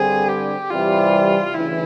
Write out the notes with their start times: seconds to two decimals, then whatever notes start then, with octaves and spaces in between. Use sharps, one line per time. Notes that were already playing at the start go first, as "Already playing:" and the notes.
Already playing: G2 D3 G3 C4 G#4
0.28 G4
0.71 C2 C3 E3 G3 F4
1.54 D2 C#3 E3 E4